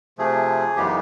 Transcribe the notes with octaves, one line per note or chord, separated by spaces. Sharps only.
C3 F3 A3 G#4
F#2 C#3 E3 G#3 B3 G4
D#4